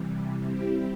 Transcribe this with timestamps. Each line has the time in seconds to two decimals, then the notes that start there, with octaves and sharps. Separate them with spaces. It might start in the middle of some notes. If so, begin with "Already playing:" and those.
Already playing: C3 E3 G3
0.41 G3 C4 E4 G4